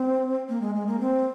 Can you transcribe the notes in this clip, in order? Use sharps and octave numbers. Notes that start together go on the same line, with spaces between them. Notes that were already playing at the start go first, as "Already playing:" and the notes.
Already playing: C4
A#3
G#3
G#3
A#3
C4